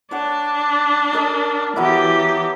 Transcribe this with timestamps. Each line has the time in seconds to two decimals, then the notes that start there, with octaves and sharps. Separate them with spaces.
0.11 D4 C#5 F#5 D6
1.13 A#4 D#5 A5
1.76 E3 F#3 B3 E4 G4